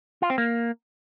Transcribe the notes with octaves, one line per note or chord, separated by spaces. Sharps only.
F4
C4
A#3